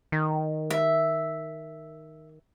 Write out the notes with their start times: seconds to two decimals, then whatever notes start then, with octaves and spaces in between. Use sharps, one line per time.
0.12 D#3
0.70 E5